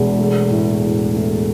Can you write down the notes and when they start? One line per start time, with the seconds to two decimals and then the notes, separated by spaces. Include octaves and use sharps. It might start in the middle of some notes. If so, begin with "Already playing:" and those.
Already playing: E1 E2
0.18 A3
0.51 A2
0.82 A2
1.14 A3